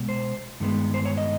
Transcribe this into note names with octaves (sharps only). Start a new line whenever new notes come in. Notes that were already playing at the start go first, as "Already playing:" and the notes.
Already playing: B2 G#3 B3
C5
G2 D#3 G#3 B3
C5
C#5
D#5